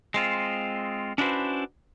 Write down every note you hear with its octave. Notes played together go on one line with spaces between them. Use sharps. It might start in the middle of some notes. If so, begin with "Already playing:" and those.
G#3 C4 F4
C#4 D4 E4 F#4 B4 C5